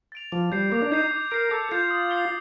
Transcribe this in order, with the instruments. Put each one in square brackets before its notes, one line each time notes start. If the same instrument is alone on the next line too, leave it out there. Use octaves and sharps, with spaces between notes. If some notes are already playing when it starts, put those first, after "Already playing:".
[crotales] A6 D7 F7
[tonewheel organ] F3 [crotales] D6
[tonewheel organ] G3 [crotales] G6 C7
[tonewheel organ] A#3 [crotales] D6
[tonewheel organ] D4
[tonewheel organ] D#4 [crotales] G6 C7
[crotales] D6
[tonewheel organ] A#4 [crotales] G6 C7
[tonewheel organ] A4 [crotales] D6
[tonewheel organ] F4 [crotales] G6 C7
[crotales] D#6
G6 C7 G7